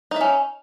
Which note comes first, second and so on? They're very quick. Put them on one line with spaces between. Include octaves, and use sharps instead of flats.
D#4 E5 C#4